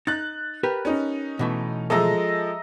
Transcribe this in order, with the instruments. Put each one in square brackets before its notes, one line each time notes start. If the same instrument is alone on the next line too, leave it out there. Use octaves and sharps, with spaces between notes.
[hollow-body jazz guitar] D#4 [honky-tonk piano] F#6 A6
[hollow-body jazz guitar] G4 A#4 B4
[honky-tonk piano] C#4 D#4
[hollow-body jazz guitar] B2 E3 A3
[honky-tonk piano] F3 G#3 A4 [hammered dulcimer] D#5 E5 A#5